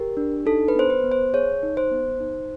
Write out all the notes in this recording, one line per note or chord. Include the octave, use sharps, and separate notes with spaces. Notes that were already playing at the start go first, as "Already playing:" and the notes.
Already playing: G4 A#4
D4
D#4 A4
B4
B3 C5
B4
B3
C5
G#4 C#5
D#4
C5
B3
D#4